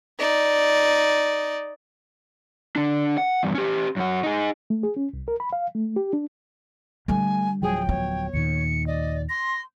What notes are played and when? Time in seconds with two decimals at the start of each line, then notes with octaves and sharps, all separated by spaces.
0.19 D#4 D5
2.76 D3 D4
3.18 F#5
3.43 E2 G2
3.55 C#4 G4
3.97 F#2 F#4
4.23 D#4 G#4
4.70 A3
4.83 G#4
4.96 C#4
5.13 C2
5.28 A#4
5.40 B5
5.53 F5
5.75 A3
5.96 G4
6.13 D4
7.08 D3 G3 A3 G#5
7.62 D1 F3 F#3 G#4 G5
7.89 B3 C#5
8.34 D#2 A#2 D#3 C#7
8.87 D5 D#5
9.29 C6 A#6